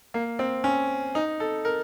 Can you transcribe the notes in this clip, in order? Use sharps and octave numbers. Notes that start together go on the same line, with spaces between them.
A#3
C4
C#4
D#4
A4
A#4